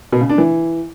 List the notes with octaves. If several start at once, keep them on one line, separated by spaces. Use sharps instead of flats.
B2
C#3
D4
E3